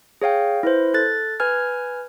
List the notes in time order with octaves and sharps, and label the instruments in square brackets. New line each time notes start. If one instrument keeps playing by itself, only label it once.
[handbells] G#4 C#5 F5 G5
E4 B4 C5
A4 F#6 A6
B4 G#5 F6 G#6